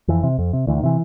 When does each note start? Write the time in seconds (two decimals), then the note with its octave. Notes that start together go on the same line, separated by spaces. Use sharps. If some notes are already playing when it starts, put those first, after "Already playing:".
0.08 F2 E3
0.23 C3
0.38 F2
0.53 C3
0.67 D2 E3
0.77 D#3
0.83 C3 E3